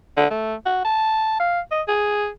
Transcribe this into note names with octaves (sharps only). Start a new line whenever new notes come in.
D3
A3
F#4
A5
F5
D#5
G#4